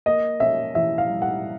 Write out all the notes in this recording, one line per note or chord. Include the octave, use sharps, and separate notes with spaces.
A#3 D#5
C#4 E5
E3 E5
F5
G3
F#5